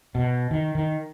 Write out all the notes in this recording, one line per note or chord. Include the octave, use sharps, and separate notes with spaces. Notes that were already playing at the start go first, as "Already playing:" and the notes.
B2
D#3
D#3